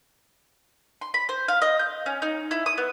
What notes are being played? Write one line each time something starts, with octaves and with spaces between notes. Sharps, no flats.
C6
B5
C5
F5
D#5
G6
C#4
D#4
E4
D#6
B3